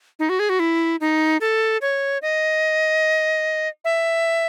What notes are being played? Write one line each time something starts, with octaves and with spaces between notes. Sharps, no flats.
D#4
F#4
G#4
F#4
E4
D#4
A4
C#5
D#5
E5